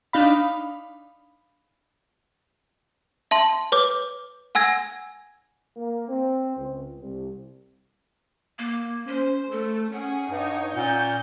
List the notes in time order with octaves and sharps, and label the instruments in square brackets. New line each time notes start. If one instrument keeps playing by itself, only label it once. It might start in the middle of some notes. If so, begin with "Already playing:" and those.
[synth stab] D4 D#4 F5 B5
[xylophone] E5 A5 C6
B4 C#5 D6
F#5 G#5 E6 G#6 A#6
[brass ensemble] A#3
C4
C#2
C2
[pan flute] A#3
[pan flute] C#4 [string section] C5
[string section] A3 [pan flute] A4
[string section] C#4 G#4 [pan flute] F#5
[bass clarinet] G2 [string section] D#4 C#5
[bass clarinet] A#2 [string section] C#4 G6